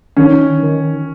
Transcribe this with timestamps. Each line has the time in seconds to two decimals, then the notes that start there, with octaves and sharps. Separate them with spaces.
0.17 D#3 C#4
0.62 D#3